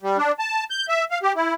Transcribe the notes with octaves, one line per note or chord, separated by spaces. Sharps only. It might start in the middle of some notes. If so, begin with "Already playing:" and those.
G3
D4
A5
G6
E5
F5
G4
E4